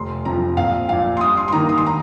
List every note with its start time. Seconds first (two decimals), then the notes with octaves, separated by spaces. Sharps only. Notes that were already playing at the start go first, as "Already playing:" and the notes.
Already playing: F1 C6
0.25 F2 F3 A#5
0.57 A#1 F5
0.88 A#2 F3 F5
1.17 C6
1.21 G2 D#6
1.37 C6
1.48 C6
1.52 D#3 A#3 D#4 A#5
1.69 D#6
1.78 C6
1.86 A#5